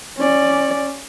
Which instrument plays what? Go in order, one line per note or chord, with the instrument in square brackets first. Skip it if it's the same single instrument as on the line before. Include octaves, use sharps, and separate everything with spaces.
[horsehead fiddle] C#4 D5